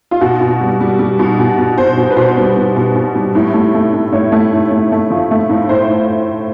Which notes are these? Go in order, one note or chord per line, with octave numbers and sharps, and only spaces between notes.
F4
B2 F#4
B2
G3
G3
G3
B2
B2
B2
B2 C5
B2
B4
B2 C5
G3
B2
B2
B2
G3
A2
A3
A3
A2
A2 C#5
A3
A2
A3
A3
F3
A3
A2
A2 C5